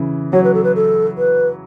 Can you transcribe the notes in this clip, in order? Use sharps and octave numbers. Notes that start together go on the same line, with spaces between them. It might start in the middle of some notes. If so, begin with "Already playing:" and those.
Already playing: C#3 E3
F#3 C#5
B4
A4
B4
A4
B4